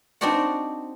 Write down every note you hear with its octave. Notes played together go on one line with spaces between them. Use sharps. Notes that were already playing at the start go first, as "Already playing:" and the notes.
C4 D4 D#4 F#4 D5 F#5